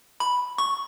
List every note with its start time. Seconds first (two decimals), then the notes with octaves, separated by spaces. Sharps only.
0.20 B5
0.58 C#6